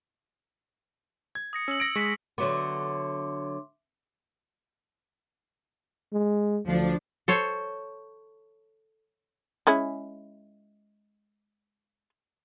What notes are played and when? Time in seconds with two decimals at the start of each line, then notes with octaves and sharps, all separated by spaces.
1.35 G#6
1.53 D#6 A#6 C#7
1.68 C#4 E6 F#7
1.80 A#6 D7
1.96 G#3 C#6 B6
2.38 D3 F#3 B3 E5 C6 D6
6.13 G#3
6.67 D2 F3 D4
7.28 A4 C5 C#5
9.67 G#3 C#4 E4